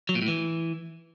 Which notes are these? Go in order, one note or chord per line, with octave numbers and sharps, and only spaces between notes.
F#3
A#2
A2
E3